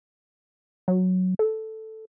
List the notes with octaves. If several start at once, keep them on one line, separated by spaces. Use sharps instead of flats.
F#3
A4